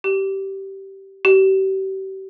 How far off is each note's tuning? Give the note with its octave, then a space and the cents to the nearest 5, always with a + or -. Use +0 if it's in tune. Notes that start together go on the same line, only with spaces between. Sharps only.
G4 -15
G4 -35